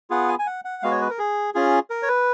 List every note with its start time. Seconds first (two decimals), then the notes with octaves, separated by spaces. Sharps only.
0.10 B3 F4 G#4 F#5
0.29 G#5
0.39 G#5
0.47 F#5
0.65 F#5
0.83 G#3 B3 F#4 F5
0.91 C#5
1.01 B4
1.10 A#4
1.19 G#4
1.54 C#4 F4 G#4
1.90 A#4
2.03 C#5
2.08 B4